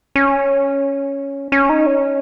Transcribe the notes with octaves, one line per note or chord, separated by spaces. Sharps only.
C#4
C#4
D#4
C#4